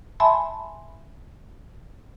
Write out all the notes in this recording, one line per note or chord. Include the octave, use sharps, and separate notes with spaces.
E5 G#5 A5 B5 C6